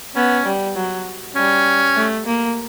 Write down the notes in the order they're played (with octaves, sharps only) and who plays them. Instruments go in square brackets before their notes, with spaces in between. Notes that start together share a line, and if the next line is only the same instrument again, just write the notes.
[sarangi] B3 [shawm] C#4
[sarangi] G3
F#3
[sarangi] G3 [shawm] C#4
[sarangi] A3
A#3